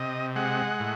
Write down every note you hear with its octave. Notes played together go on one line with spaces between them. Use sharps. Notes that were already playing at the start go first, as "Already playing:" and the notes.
Already playing: C3 D#5
G#3 F#5
A2